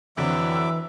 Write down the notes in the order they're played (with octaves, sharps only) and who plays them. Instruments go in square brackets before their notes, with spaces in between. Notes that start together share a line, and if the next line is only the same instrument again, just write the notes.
[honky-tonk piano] F2 D3 C4 [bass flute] E3 [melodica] F#3 E5 D6 [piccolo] E6